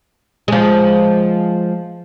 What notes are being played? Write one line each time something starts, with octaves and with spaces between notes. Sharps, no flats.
F3 G#3